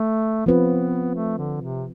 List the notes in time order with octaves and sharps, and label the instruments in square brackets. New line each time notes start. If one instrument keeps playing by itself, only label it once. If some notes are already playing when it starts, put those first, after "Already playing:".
Already playing: [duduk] A3
[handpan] F3 C4 F4 B4 [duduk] B3
[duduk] A3
D3
C3